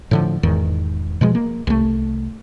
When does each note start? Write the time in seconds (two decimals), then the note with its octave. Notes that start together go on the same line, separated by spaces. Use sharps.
0.11 A2 D3 F3
0.43 E1 E2 G#2 D#3
1.21 B2 F3 G#3
1.35 A#3
1.67 C2 A3